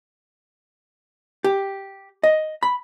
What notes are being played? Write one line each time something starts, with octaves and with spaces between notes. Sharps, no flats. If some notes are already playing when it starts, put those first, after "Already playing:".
G4
D#5
B5